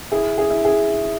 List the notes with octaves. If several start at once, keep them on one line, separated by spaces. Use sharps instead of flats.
E4 G#4
G#4
E4
G#4